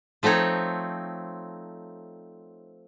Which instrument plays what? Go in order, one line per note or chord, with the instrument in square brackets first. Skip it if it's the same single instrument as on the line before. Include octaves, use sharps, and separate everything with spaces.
[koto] F3 A3 C4 D#4 C#5